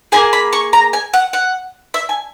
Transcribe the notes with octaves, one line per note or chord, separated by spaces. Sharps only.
A#3 E4 G#4 G#5
B5
C#6
A#5
G#5
F#5
F#5
E5
G#5